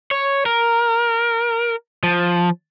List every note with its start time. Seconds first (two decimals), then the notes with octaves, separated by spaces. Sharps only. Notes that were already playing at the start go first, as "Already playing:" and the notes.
0.11 C#5
0.46 A#4
2.03 F3